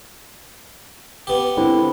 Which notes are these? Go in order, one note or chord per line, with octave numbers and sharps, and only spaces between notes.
B3 G4
D3 C4 E4